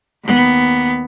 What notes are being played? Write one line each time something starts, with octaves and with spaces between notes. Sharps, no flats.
D#2 B3